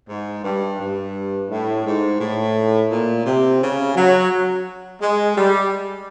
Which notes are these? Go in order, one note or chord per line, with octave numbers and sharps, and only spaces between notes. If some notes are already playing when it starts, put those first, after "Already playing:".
G#2
G2
G2
A2
G#2
A2
A#2
C3
C#3
F#3
G#3
G3